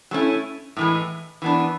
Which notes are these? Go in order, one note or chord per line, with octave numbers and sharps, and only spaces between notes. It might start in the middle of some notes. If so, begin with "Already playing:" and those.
F#3 A3 C#4 E4
A2 E3 G#3
E3 B3 D4